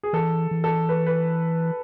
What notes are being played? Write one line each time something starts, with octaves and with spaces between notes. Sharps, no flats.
G#4
E3 A4
E3
A4
B4
B4